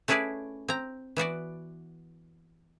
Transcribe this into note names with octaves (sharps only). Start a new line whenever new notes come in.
A3 C#4 E4 G#4 B4 D5
C4 A#5
E3 B3 F#4 D5